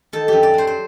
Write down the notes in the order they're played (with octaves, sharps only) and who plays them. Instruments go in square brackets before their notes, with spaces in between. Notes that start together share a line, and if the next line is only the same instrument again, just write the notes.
[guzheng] D#3 A4
F#2 G4
D5
F#3 C5
C5